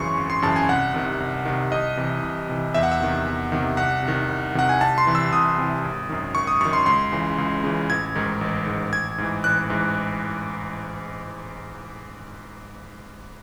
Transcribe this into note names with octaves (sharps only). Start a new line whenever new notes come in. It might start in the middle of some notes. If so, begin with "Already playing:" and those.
Already playing: G#1 F#2 C#3 E3 C6 C#6
G#1
C6
F#2 C#3 E3 A5
G#5
C2 F#5
C3 D#3
C2
C3 D#3
C2 D#5
C3 E3
C2
C3 E3
E2 E5
F#5
E5
C3 D#3
E2
C3 D#3
C2 F#5
C3
D#3
C2
C3 D#3 F#5
G#5
C2 A5
C6
C3 E3
E6
C2 D#6
C3 E3
G#1
F#2 D#3
G#1 C#6
D#6
F#2 D#3 C#6
C6
C#2 C6
C#3 E3
C#2
C#3 E3
A1 G#6
G#2 D#3
A1
G#2 D#3
A1 G#6
G#2 E3
A1 F#6
G#2 E3